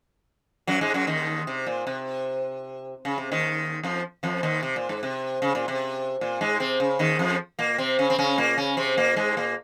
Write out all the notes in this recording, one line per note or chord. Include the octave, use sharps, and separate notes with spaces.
F#2 F#3
G#2 G#3
F#2 F#3
D#2 D#3
C3
A#2
C3
C#3
C3
D#2 D#3
F2 F3
F2 F3
D#2 D#3
C3
A#2
G#2
C3
C#3
A#2
C3
A#2
G#2 G#3
C3 C4
C#3
D#2 D#3
F2 F3
A#2 A#3
C3 C4
C#3 C#4
C4
C#3 C#4
A#2 A#3
C#3 C#4
C3 C4
A#2 A#3
G#2 G#3
A#2 A#3